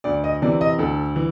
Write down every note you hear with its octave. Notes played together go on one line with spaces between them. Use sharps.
D2 D5
D#5
C3 E3 D5
D#5
D2 A4
E3